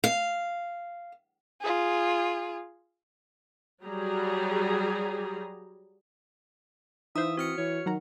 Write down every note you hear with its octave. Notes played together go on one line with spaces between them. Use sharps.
F5
F4 G#4
F#3 G3 G4 G#4 A#5
E3 D#4 C5 E5 F5 D#6
C4 F#4 F6 C#7
E3 C#5
D#3 F#3 F#5 A#5